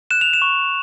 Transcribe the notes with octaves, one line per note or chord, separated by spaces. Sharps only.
F#6 E7
F7
E7
C#6